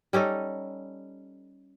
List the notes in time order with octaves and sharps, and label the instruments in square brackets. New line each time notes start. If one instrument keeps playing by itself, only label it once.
[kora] G3 C#4 D#4 A4